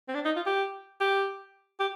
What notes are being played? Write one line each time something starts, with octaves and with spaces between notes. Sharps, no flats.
C4
D4
D#4
F4
G4
G4
G4